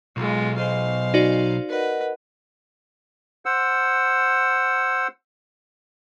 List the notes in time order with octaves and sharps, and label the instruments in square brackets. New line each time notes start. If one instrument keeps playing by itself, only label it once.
[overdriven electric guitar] B1 [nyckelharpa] G#3 F4
[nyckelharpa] C5 F5 [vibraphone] D#5 G#5
[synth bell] D#4 F#4 D5
[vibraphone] A#4 D#5 F#5 [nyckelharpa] B4
[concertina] C5 F#5 E6